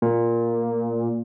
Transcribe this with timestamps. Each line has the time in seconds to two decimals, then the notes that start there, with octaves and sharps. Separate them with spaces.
0.02 A#2